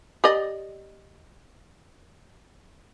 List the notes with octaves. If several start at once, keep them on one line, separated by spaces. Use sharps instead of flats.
G4 D5 D#5